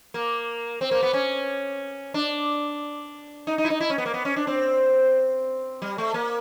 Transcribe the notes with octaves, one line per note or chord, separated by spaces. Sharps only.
A#3
C4
A#3
B3
C#4
D4
D#4
D#4
E4
D#4
E4
C#4
B3
A#3
B3
C#4
D4
C4
G3
A3
A#3